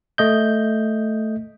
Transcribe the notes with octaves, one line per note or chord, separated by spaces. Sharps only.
A3 D#5 G6